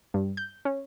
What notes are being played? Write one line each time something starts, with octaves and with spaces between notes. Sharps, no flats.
G2
G6
C#4